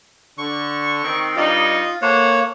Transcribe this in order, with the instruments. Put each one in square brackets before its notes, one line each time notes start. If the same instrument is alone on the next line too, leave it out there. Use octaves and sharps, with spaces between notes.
[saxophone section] D3 [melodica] C#6
[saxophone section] D#3 C4
[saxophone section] G2 G3 D#4 [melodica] F4
[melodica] A#3 C#5 [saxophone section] A4 C5 F#5